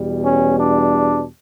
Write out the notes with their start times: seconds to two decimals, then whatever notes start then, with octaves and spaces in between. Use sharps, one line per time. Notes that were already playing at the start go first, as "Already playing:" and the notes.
Already playing: E2 B2 G3
0.23 C#4
0.57 D4